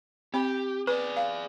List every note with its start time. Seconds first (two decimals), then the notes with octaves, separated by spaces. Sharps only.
0.34 C4 G4 B5
0.87 G#4 B4 D5
1.16 F5